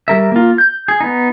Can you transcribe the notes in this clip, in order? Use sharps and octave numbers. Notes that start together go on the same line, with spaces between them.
G3 A#4 E5
A#3 F4
G6
G#4
B3 D#4